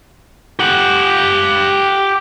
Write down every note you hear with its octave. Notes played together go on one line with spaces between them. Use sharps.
G4 F#5